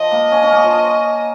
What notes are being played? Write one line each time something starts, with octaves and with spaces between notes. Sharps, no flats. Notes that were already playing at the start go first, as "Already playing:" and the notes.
Already playing: F3 D#5
A#3
C#4
C#4
A#3
F3